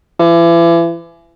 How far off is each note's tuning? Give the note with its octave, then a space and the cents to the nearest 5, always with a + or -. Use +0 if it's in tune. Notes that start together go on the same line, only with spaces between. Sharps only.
E3 +35